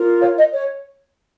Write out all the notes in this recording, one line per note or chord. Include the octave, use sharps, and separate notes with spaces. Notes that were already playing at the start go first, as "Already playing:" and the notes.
Already playing: F4 A#4
C#5 F5
D#5
C#5